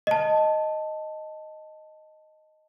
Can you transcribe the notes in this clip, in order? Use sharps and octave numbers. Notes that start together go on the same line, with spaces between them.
D#5 A5